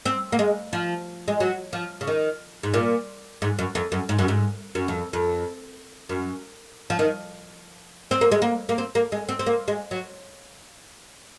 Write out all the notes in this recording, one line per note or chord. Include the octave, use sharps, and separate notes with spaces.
C4
A#3
G#3
F3
G#3
F#3
F3
C#3
D#3
G#2
A#2
G#2
F#2
F2
F#2
G#2
F#2
G#2
F#2
F2
F2
F#2
F3
D#3
C4
A#3
G#3
A#3
A#3
C4
A#3
G#3
C4
C4
A#3
G#3
F#3